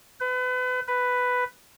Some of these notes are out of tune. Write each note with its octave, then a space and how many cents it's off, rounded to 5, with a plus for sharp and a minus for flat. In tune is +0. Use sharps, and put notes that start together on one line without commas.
B4 +35
B4 +5